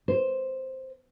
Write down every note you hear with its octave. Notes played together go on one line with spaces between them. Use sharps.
C5